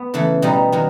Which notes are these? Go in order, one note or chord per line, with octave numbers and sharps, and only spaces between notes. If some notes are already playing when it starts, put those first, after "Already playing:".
Already playing: B3
C#3 E3 A3
B2 G3 B3 D#4
D#3 F#3